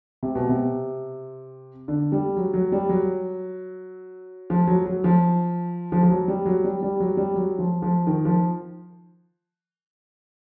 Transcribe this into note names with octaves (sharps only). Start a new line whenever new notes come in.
C3
B2
C3
D3
G3
F#3
F#3
G3
F#3
F3
F#3
F#3
F3
F3
F3
F#3
G3
F#3
G3
G3
F#3
G3
F#3
F3
F3
D#3
F3